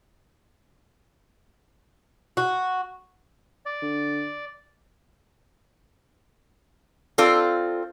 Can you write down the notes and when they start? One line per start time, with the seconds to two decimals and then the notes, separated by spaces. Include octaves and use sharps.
2.37 F#4
3.66 D5
3.82 D3
7.18 C4 F4 A4 D5